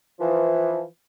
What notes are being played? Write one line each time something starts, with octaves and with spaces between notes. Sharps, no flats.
E3 F3